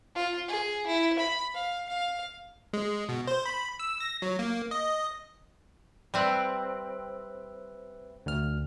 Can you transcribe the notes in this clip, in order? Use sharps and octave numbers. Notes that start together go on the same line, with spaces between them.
F4
G#4
E4
B5
F5
F5
G#3
B2
C5
B5
E6
A#6
F#3
A#3
D#5
G3 C4 B4 E5 F#6
D2 F6